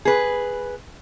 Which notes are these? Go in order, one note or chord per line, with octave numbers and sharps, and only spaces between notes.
G#4 B4